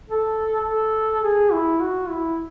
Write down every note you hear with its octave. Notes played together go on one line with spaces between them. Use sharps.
A4
A4
G#4
E4
F#4
E4